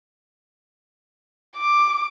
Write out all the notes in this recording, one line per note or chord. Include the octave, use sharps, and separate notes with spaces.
D6